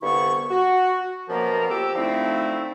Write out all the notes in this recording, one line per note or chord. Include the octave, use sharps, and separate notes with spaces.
C2 G2 D3 B3 E4 C#6
F#4
F#2 B2 F3 A#3 B3 A#4
F2 G4 D6 E6
D3 F3 A3 C4 D#4 E4